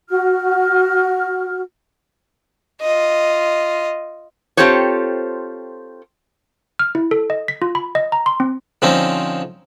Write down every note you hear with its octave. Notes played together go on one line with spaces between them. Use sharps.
F#4 F6
F4 D#5
C4 F4 G4 A4 C5 C#5
F6
E4
A4
D#5
B6
F4
B5
D#5
A#5
C6
C4
D3 F3 C4 C#4 D#4